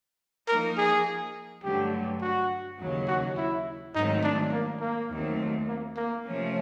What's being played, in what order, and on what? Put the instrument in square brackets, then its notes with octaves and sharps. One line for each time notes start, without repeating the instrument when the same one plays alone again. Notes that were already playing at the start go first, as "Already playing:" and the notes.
[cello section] F3 A#3 D#4 [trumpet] A#4
[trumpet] G#4
[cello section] G2 D3 F#3 A3 [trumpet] G4
[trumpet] F#4
[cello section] D#2 C#3 F#3
[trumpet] F#4
E4
[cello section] G#2 D#3 F#3 A3 C4 [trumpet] D#4
[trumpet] D4
A#3
A#3
[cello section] D#2 D#3 F#3 A3 C4
[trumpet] A#3
A#3
[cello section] C3 F3 A3 C#4